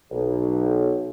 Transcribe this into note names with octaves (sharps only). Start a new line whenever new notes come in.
B1